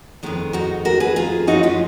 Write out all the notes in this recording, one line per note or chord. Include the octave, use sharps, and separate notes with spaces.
F2 D#3 G#3 B3
D#4 F#4
F#4 A#4
G#4 B4
F4 G#4
F#2 F3 G#3 D#4 F#4
C#4 F4